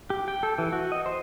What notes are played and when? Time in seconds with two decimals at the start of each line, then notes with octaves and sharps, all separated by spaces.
0.10 G4
0.28 G5
0.43 A4
0.58 E3
0.73 F#4
0.92 D#5
1.06 C5